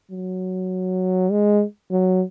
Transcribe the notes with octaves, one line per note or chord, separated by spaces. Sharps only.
F#3
G#3
F#3